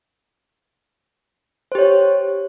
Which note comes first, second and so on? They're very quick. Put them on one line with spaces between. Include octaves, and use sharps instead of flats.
C5 G4 C#5